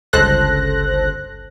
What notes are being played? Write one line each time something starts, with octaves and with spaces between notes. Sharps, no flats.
G1 C#2 A4 C5 F#6 A#6